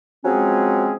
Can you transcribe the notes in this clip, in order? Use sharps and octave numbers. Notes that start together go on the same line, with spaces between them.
F3 F#3 G#3 C4 C#4 G#4